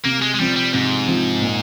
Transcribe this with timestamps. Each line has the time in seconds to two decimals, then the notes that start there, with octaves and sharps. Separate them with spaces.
0.05 C3 A#3
0.22 G#3
0.34 G#3
0.40 F3 G3 C4
0.56 G3
0.73 G#2 C3
1.07 F3 C4
1.42 A#2